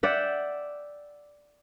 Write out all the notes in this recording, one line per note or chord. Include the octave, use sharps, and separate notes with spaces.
D5 E5 F#5 G5